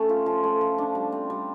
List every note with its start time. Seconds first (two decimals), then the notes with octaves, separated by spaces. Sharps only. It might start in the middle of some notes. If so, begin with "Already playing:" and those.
Already playing: A3 C#4
0.09 F4
0.26 F3
0.44 A3
0.61 F3
0.78 D4
0.95 G3
1.12 C4
1.30 G3